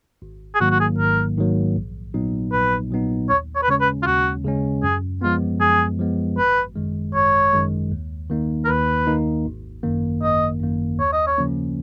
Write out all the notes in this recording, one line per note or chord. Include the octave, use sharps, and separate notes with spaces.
G#1
G#4
G#2 D#3 F#3 A#3 F#4
F#4
G#4
G#1 A#4
G#2 D#3 F#3 A#3
A#1
A#2 F#3 B3 D#4
A#1 B4
A#2 F#3 B3 D#4
D#2 C#5
C#5
B4
C#3 G#3 C#4 C#5
B4
F4
D#2 F#4
C#3 G#3 C#4
F#2 G#4
F3 G#3 B3 F4
F#2 G#4
F3 G#3 B3
G#1 B4
F#2 D#3 G#3
G#1 C#5
F#2 D#3 G#3
D#2
D#3 A#3 D#4
A#4
D#2 B4
D#3 A#3 D#4
G#1
F#2 D#3 A#3
G#1 D#5
F#2 D#3 A#3
D#2 C#5
D#5
C#5
C#3 F3 A#3 C#4